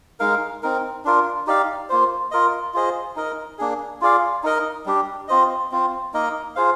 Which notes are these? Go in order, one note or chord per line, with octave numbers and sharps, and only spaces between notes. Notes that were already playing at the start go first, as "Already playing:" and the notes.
G#3 D#4 A#4 F5
C4 D#4 A#4
D4 F4 A#4
D#4 G4 D5 F5
A#3 F4 C5
F4 A#4 D#5
F4 G#4 C5 D#5
D#4 A#4 D#5
A#3 D4 G#4
F4 G#4 D5 F5
D#4 A#4 D#5
G3 D4 G4
C4 F4 C5 D#5
C4 F4 C5
A#3 D#4 A#4 D#5
F4 G#4 C5 F5